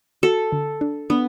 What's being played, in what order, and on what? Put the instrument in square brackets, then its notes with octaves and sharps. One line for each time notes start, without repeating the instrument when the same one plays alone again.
[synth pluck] F#4 [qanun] A4
[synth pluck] D3
D4
[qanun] B3 [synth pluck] D4